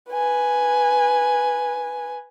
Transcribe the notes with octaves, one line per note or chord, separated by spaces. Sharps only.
B4 G#5